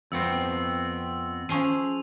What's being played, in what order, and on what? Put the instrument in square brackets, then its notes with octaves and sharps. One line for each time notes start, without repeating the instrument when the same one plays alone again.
[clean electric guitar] F2 B3 C4 [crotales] E6
[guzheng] F3 C#4 G#4 [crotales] D#7 F7